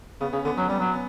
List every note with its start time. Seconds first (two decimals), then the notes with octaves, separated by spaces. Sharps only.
0.21 C#3 B3
0.33 C#3 C#4
0.45 D3 B3
0.57 F#3 C#4
0.68 G3 B3
0.79 F#3 C#4
0.94 B3